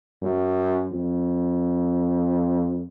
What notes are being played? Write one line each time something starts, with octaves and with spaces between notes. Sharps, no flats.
F#2
F2